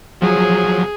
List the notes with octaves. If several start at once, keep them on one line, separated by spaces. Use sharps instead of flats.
F3 F#3 G#4